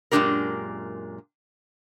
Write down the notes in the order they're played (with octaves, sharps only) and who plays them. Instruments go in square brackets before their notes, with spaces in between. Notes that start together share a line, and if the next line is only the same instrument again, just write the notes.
[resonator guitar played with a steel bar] F#2 A#2 G#3 D4 G4 A#4